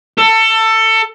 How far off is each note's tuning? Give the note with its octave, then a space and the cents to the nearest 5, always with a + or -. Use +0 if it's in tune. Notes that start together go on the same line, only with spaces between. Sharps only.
A4 +20